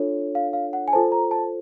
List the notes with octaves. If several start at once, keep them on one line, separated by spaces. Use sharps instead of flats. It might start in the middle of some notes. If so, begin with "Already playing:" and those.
Already playing: D4 F4 A4 C#5
F5
F5
F#5
G#5
F4 A4 C5 A5
A#5
A5